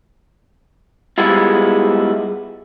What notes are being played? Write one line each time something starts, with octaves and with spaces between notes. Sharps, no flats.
G3 G#3 B3 E4 F4